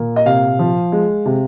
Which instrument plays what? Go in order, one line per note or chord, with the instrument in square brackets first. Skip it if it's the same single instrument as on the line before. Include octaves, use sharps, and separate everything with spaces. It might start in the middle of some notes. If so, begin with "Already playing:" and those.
Already playing: [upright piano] A#2 A#3
D#5
C3 F5
F3
G#3
C3